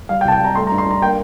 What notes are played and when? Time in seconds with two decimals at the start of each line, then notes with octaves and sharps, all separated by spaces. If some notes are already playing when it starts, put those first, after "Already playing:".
0.09 G3 F5
0.21 G5
0.25 C2 A5
0.32 G5
0.40 G3 A#5
0.55 A3 C6
0.67 A#5
0.72 G2
0.78 C6
0.86 G2 A#5
1.02 A#3 G5